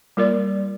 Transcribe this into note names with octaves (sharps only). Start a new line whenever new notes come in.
G3 A#3 F4 A#4 D5